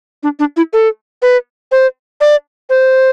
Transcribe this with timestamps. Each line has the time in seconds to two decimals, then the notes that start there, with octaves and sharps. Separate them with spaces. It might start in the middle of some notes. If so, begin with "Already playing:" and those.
0.23 D4
0.39 D4
0.57 E4
0.73 A4
1.22 B4
1.72 C5
2.21 D5
2.70 C5